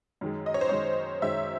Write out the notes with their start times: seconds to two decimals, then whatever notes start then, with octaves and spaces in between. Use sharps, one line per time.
0.21 F#2 D#3 G#3
0.46 D#5
0.54 C#5
0.61 C5
0.69 F#2 D#3 G#3 C#5
1.22 F#2 D#3 G#3 E5